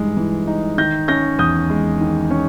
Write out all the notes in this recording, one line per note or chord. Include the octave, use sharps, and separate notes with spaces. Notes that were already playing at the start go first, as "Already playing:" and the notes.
Already playing: G2 E3 G#3 D#4
E3
D#4
D#3 G6 A#6
C#4 G6 A#6
E2 D#6 G6
G#3
D#3
C#4